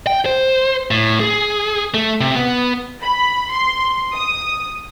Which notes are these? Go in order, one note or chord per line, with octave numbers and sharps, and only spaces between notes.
G5
C5
A2
G#4
A3
C3
B3
B5
C6
D#6